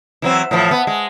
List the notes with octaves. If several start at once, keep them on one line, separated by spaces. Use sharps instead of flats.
E3 F#3 C4
A2 E3 F3
B3
G#3